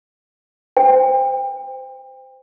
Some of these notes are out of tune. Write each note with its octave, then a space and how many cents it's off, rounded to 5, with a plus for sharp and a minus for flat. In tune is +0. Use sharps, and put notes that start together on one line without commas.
C5 -20 G5 +30